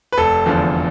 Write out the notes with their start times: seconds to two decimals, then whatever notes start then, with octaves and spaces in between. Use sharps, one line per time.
0.12 B4
0.17 F1 A4
0.46 E2 D3 F3